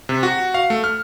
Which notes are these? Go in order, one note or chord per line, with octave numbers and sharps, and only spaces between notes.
C3
F#4
F5
A3
F6